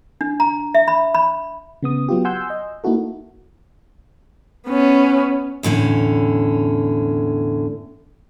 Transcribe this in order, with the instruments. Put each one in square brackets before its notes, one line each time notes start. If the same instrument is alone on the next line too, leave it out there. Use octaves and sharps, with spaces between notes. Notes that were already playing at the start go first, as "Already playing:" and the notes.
[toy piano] D4
A#5
E5
B5
B5
[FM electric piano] C#3 B3 D#6
F#3 B3 F4 G4
F#5 G#5 C6 E6 G6
D#5
A#3 D#4 E4 F#4 A4
[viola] B3 C#4
[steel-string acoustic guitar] E2 A2 D3 C#4